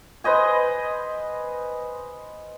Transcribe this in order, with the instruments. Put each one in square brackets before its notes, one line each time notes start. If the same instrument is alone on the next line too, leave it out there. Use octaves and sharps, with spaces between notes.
[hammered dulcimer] B4 C5 D#5 G#5